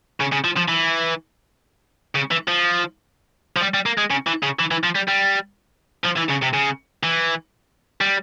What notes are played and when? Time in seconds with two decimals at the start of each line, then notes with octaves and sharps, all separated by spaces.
0.20 C#3
0.32 C#3
0.44 F3
0.57 F3
0.68 E3
2.15 C#3
2.31 E3
2.48 F3
3.56 F3
3.61 G3
3.74 G3
3.86 A#3
3.98 G#3
4.10 C#3
4.27 E3
4.43 C#3
4.59 E3
4.71 E3
4.84 F3
4.95 G3
5.08 G3
6.05 F3
6.18 E3
6.30 C#3
6.43 C3
6.54 C#3
7.03 E3
8.01 G3